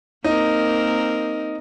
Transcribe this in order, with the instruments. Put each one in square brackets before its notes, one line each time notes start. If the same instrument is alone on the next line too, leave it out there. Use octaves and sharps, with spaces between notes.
[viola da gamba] A#3 C4 A#4 [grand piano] D#4